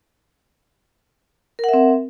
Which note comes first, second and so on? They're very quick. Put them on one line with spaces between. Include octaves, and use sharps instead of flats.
A#4 F#5 E5 C4